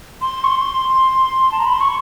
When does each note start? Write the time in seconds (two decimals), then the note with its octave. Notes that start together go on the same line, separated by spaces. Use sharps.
0.21 C6
0.44 C#6
0.48 C6
1.52 A5
1.59 A#5
1.66 B5
1.73 C6
1.81 C#6